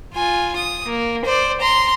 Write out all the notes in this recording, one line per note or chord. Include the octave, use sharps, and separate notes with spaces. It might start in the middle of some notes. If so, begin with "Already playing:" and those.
F4 G#5
D#6
A#3
C5 D5
A#5 C6